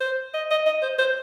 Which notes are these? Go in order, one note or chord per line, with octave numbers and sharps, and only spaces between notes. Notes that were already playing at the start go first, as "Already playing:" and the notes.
C5
D#5
D#5
D#5
C5
C5